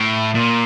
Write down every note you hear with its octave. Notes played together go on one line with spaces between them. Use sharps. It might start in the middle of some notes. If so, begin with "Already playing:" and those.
Already playing: A2
A#2